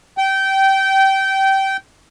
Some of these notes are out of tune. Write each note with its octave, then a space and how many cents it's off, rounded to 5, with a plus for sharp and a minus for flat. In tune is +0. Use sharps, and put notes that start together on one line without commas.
G5 -20